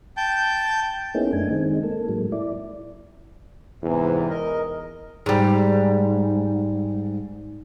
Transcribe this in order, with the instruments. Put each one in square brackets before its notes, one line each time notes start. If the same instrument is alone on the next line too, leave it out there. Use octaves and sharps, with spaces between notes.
[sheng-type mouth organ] G5 A5 G6
[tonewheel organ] A#3 B3 C#4 D#4 E4 G#4
F#2 A3 D4 G#5
D#3 G#3 C4 D#4
A#3 A4
A2 F#3 G#3 A#3
E4 D5
[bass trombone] E2 [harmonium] G#2 C3 E3
[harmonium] A#4 D#5
[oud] G#2 G3